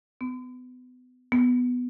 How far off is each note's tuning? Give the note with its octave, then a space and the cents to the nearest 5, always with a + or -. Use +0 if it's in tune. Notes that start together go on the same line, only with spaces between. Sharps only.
B3 +30
B3 +5